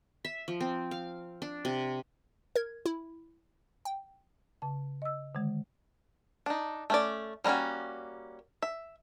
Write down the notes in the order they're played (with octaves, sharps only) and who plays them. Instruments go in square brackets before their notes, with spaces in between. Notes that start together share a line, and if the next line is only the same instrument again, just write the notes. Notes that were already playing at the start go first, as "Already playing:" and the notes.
[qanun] E5
F3
C4
F5
D4
C3
[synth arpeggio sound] A#4 G#6
E4
G5
[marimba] C#3 A5
D#5 E6
D3 D#3 G#3
[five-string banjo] D4 D#4
A3 C#4 D5
G3 A#3 C4 C#4 F#4
E5